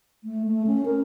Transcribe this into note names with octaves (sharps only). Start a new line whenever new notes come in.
A3
A3
C#4
A#4